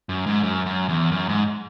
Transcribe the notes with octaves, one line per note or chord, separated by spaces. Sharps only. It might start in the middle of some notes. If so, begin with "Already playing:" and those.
F#2
G#2
F#2
F#2
E2
F#2
G#2